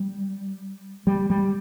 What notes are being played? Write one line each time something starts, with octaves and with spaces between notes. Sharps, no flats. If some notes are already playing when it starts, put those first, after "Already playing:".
Already playing: G3
G3
G3